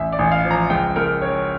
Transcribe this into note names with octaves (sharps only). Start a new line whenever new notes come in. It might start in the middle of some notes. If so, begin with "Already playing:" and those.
Already playing: A1 E5
D5
A1
F5
F3
A#5
C#2 G5
C#2 A#4
F3 C#5